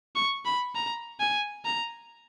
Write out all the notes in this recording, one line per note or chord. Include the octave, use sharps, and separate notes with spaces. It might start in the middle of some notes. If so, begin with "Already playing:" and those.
C#6
B5
A#5
G#5
A#5